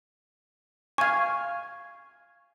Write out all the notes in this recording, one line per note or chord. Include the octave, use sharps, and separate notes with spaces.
F5 G#5 C#6 G#6